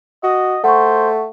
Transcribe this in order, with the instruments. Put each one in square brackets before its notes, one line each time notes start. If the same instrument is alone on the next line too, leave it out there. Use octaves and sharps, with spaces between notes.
[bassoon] F#4 [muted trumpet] D#5
[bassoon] A3 [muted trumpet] C5 [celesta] F#5 C#6